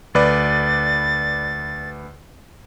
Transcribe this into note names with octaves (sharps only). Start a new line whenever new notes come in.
D2 B4 D5 A6